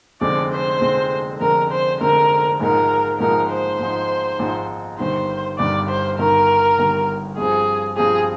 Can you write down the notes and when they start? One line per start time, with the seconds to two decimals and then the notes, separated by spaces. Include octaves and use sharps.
0.21 F1 F2 D3 G#3 C4 D5
0.52 C5
0.81 F1 F2 D3 G#3 C4
1.40 F1 F2 D3 G#3 C4 A#4
1.71 C5
2.00 F1 F2 D3 G#3 C4 A#4
2.59 G#1 G#2 F3 G#3 D#4 A#4
3.19 G#1 G#2 F3 G#3 D#4 A#4
3.49 C5
3.79 G#1 G#2 F3 G#3 D#4
4.39 G#1 G#2 F3 G#3 D#4
4.99 G1 G2 D#3 C5
5.58 G1 G2 D#3 D5
5.89 C5
6.18 G1 G2 D#3 A#4
6.78 G1 G2 D#3
7.37 G2 F3 C4 G#4
7.97 G2 F3 C4 G#4